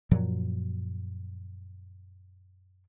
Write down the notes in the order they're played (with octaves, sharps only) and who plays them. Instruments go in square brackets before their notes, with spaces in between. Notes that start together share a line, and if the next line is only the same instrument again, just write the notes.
[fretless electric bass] F#2 A#2 F3 F#3